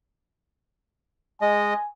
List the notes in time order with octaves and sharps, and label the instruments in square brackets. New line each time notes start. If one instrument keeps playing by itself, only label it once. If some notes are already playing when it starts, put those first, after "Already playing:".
[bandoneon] G#3 D#5 [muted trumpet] G#5